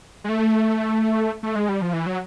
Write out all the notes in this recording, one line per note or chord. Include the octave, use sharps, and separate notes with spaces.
G#3
A3
A3
G#3
G3
F3
E3
F#3